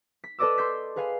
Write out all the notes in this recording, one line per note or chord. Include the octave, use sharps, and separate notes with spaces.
B6
A4 B4 D5 D#5 D6 E6
C6 G6 B6
G#4 B4 F5 G#5 C7